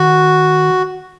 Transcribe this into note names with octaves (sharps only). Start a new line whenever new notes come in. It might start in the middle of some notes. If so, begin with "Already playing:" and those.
Already playing: D#3 F#4